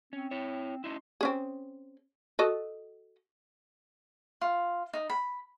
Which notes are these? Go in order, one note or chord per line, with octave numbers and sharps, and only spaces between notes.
C4 C#4
E4 C#5
C#4 D#4 E4 C6
C4 C#4 G#4
F#4 A4 D#5
F4
D#4
B5